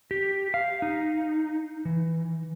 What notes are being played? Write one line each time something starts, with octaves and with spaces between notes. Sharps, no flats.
G4
F5
D#4
E3